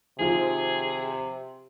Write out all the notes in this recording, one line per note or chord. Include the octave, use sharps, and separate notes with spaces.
C3 D#3 F3 F4 G#4